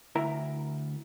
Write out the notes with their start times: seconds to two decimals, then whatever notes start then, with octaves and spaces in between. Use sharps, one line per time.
0.16 D2 E4 A#4 A#5